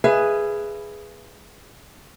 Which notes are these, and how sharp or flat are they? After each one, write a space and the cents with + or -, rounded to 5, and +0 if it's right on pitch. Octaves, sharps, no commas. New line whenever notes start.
G#4 +0 B4 +0 E5 +40